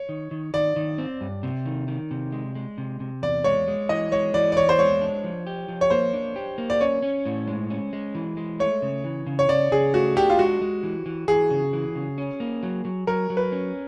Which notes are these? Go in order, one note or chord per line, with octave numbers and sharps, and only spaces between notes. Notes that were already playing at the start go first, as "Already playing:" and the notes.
Already playing: C#5
D#3
D#3
D#3 D5
D#3
C4
G2
C3
D#3
D#3
C3
G#3
G#3
C3
C3
E2 D5
G#3 C#5
G#3
E3 D#5
G#3 C#5
E3 D5
D5
E2 C#5
C5
G#3 C#5
D4
F3
G4
F3
C#5
A#3 C5
D4
G4
A#3
D5
C#4 C#5
C#4
A2
G#3
C#4
G#3
E3
G#3
A3 C#5
C#3
E3
C#3
C#5
C#3 D5
C#3 G#4
A3 F#4
D4 G4
F4
G#3 F#4
G#3
E3
E3
E3 G#4
C#3
E3
C#3
C#4
A#3
F#3
F#3
F#3 A#4
F#3
B4
C#4